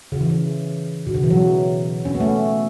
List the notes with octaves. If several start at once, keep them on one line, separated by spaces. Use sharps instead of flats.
C#3
E3
C#3
B2
C#3
E3
F#3
C#4
B3
A3